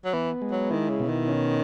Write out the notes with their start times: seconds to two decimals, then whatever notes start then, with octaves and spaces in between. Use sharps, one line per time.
0.05 F#3
0.13 E3 B3
0.42 G#3
0.51 F#3
0.71 D#3 E4
0.89 C#3
1.00 B2
1.09 D#3
1.28 C#4